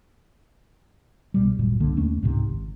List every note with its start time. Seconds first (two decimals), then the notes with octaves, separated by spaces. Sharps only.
1.34 C2 B2 G3
1.59 D1 G#1 F#2 A#2
1.80 C2 D3 A#3
1.97 D#2 A3 C#4
2.22 C#2 G#2 C3
2.49 G#1